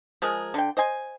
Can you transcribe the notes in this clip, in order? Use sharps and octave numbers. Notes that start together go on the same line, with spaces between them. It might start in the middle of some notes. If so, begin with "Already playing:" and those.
F3 G#3 G#4 A#4
D3 G5
C5 D#5 G#5